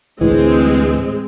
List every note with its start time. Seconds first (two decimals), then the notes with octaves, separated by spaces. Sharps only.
0.21 D2 A2 E3 G#3 C4